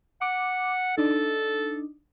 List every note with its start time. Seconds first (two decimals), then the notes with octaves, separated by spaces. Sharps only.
0.22 F#5 D6
0.98 D4 D#4 A4